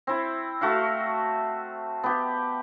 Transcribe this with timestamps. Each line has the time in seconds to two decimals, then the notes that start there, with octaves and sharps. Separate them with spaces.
0.07 C4 E4
0.61 A3 F#4 E5 F5
2.04 B3 G4